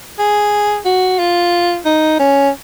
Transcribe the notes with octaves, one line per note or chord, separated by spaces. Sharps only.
G#4
F#4
F4
D#4
C#4